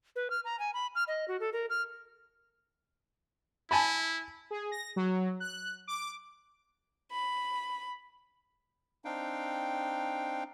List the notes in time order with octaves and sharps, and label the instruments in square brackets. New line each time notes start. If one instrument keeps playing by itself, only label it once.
[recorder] B4
F6
A#5
G#5
B5
F6
D#5
F#4
A4
A#4
F6
[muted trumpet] E4 [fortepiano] G#5 A5 B5
[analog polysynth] G#4
A#6
F#3
F#6
D6
[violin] B5
[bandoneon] C4 D4 D#4 F5 G5